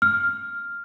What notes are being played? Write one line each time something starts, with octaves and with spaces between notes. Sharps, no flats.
F6